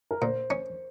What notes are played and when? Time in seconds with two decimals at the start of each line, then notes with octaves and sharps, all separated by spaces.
0.11 A#4
0.22 A#2 C5
0.50 C#4